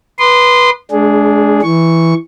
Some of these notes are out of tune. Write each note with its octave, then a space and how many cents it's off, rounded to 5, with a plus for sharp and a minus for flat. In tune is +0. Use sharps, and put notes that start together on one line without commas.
B4 -15 C6 -15 D#6 -40
G#3 +35 D4 -15 G#4 +0
E3 +0 C#6 +0